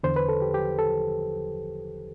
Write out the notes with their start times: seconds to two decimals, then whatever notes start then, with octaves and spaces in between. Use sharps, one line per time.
0.03 E2 D3 C5
0.16 B4
0.29 A4
0.42 G4
0.54 G4
0.79 A4